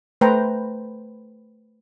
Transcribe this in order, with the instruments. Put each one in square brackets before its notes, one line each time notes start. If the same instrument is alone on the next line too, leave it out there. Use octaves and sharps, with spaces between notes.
[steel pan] A3 B4 C5 G5 A#5